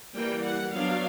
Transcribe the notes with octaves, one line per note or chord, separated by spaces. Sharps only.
E3 G3 A#3 G5
F#5
F#3 B3 D4 F5